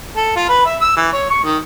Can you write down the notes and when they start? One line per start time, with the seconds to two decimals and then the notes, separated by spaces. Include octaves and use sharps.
0.16 A4
0.36 F4
0.49 B4
0.66 E5
0.81 E6
0.96 E3
1.12 C#5
1.30 C#6
1.44 D#3